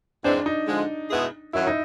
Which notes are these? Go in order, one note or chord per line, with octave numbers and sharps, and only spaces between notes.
G#2 E3 G#3 C4 D4
D#4
D3 F3 G#3
B2 G#3 B3 E4 G#4
F#2 D#3 F#3 E4
D#4